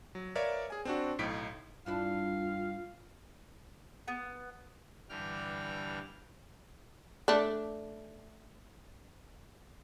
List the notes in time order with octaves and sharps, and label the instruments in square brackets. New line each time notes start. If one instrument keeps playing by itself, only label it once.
[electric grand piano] F#3
A#4 B4 C#5 D5 E5 F5
G#4 G#5
C4 D4 F#4
B1 A2 D#4 B6 D7
[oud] G2 D4 E4 [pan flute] F4 [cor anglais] F5
[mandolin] B3
[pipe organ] G2 D3 E3 G3 G5 F6
[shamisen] A3 D4